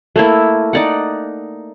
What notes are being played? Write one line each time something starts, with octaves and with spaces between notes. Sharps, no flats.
A3 A#3 E4
D#4 D5 F#5